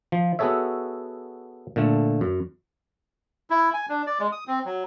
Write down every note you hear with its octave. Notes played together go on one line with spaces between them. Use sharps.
F3
B3 F#4 G#4 A4 C#5 E5
A#2 D3 A3
F#2
E4
G#5
D4
D5
G#3
D#6
C4
F#3